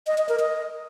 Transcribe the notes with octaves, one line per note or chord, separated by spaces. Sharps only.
D#5
D#5
A#4
D#5